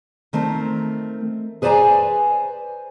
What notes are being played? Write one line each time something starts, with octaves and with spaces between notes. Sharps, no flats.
D#3 A3 C4 A#4
G#4 B4 C5 D5 G#5 A#5